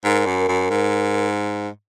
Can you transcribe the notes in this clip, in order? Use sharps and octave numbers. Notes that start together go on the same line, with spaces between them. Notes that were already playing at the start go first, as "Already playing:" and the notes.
G#2 A#4
F#2
F#2
G#2